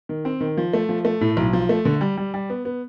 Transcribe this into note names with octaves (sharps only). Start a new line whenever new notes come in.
D#3
C4
D#3
F3
A3
F3
A3
A2
B1
F3
A3
D3
G3
G3
G3
B3
B3